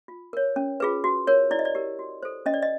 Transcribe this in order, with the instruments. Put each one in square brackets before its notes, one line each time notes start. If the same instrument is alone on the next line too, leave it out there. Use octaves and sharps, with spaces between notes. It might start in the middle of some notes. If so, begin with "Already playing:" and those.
[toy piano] F4
A#4 C#5
C#4
F4 G#4 B4
F#4
A#4 C#5
E4 D5
D#5
D5
G4 A#4
F#4
A4 C5
C#4 D#5
D5
D#5